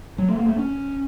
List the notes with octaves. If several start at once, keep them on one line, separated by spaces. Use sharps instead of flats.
F#3
A3
A#3
A3
C#4